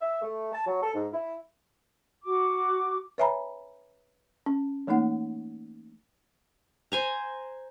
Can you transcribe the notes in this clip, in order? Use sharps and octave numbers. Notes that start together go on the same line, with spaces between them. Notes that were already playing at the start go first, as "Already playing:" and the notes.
E5
A3
A5
F#3
A4
G#2
E4
F#4 D6
B4 C#5 E5 G#5 A#5 B5
C#4
E3 A3 A#3 D#4 F#5
C5 G#5 A#5